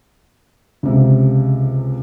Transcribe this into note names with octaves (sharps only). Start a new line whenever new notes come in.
C#2 C3